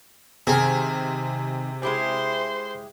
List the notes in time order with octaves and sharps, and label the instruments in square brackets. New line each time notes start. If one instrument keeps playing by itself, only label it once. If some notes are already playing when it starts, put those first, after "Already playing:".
[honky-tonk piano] C3 [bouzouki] D#3 C4 [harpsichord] G#4
[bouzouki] G#3 E4 G4 [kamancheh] C5 C6